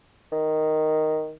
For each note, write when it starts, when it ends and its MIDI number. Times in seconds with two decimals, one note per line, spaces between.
0.32 1.32 51